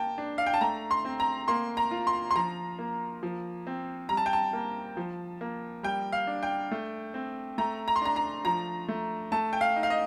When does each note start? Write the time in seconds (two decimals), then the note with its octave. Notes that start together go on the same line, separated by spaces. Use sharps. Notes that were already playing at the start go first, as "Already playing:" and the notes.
Already playing: A#3 G5 A5
0.18 D4
0.38 F5
0.46 G5
0.54 A5
0.61 A3 A#5
0.91 C6
1.05 C4
1.20 A#5
1.48 A#3 C6
1.77 A#5
1.91 F4
2.07 C6
2.31 C6
2.36 F3 A#5
2.79 A#3
3.23 F3
3.67 C4
4.09 G3 A#5
4.17 A5
4.26 G5
4.33 A5
4.53 A#3
4.97 F3
5.41 A#3
5.83 G3 G5
6.12 F5
6.27 D4
6.43 G5
6.71 A3
7.14 C4
7.58 A3 A#5
7.88 A#5
7.96 C6
8.01 D4 A#5
8.16 A#5
8.45 F3 A#5
8.88 A3
9.32 A3 A5
9.53 G5
9.61 F5
9.76 D#4
9.83 F5
9.90 D#5